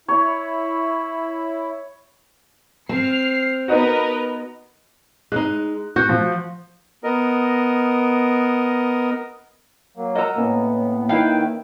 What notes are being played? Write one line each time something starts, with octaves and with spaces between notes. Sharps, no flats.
E4 C#5
C4 F6 C7
B3 D#4 F#4 A#4 B4 D#5
G#3 D#4 F#6
F#4 G6
F3
B3 A#4 D#5
F#3 A#3
A#4 D#5 F#5 A#5 E6
A2 A#3 B3 C#4
D#3 E4 B4 F5 G5